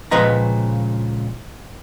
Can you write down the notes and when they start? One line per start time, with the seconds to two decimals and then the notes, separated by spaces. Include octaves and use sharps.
0.11 C#2 A#2 F3 B4 D#5 A#5